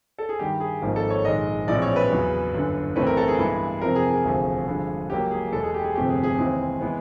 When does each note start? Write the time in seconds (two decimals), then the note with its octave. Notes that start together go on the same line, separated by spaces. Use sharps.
0.19 A4
0.29 G#4
0.39 G2 D#3 G3 G4
0.60 G#4
0.82 G#1 G#2 F3 A#3
0.96 A4
1.10 C#5
1.25 A#1 G#2 D#3 G#3 D#5
1.67 A#1 A2 E3 G#3 C4 D5
1.82 C#5
1.96 B4
2.10 E2 C#3 F#3
2.53 G1 F#2 D3
2.96 B1 A2 E3 A3 C4 B4
3.07 A#4
3.17 A4
3.28 G#4
3.38 G2 E3 G#3 B3
3.81 F2 C3 F3 A#4
3.95 G#4
4.10 G#4
4.24 E1 D2 C3 F3 A3
4.67 G2 D3 F3 G#3
5.10 C#2 C#3 F#3 A#3 G4
5.31 G#4
5.52 E2 B2 G#3 A4
5.63 G#4
5.74 G4
5.84 G#4
5.95 G1 F2 C3 F3 A3 G4
6.09 G#4
6.23 G#4
6.38 D#2 C#3 E3 G#3 C4 G#4
6.81 E3 G#3 B3